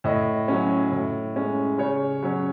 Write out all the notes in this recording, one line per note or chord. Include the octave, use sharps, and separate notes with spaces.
A2 D#5
F#3 C#4
A2
G#3 C#4
C#3 C#5
F#3 C#4